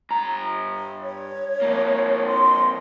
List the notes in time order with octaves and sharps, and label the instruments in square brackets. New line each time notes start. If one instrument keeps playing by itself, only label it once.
[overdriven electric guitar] G2 A#5
[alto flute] C#5
[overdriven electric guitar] F2 A#3
[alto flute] C6